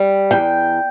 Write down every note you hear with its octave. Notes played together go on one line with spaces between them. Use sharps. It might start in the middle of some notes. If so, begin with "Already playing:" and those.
Already playing: G3
E2 G5